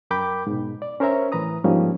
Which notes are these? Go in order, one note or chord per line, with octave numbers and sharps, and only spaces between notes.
F#2 A#4 G5 B5 D6 G6
G#2 B2
D5
C#4 A#4 C5 C#5 E5 A#5
A2 E3 B4 A#5 D#6
G#2 F3 G3 A#3 C#4